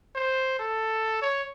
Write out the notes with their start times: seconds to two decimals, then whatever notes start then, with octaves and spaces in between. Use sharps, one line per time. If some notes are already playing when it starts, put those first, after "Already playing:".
0.15 C5
0.59 A4
1.22 C#5